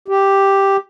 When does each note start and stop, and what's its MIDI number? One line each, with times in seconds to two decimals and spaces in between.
0.08 0.77 67